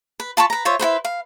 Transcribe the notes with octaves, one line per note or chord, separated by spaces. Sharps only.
B4
F4 A5 B5 C#6
B4 A#5
F4 C5 C#5 E5
E4 F#4 B4 C5
F5